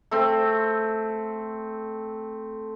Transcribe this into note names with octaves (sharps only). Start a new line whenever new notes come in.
A3 C4